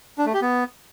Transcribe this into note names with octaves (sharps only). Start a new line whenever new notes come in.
D4
A3
G4
B3